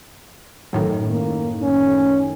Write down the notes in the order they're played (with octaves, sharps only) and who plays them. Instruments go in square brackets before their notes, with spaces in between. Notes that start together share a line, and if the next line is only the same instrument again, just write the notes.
[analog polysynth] F#2 A2 D#3
[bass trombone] A#3
C#4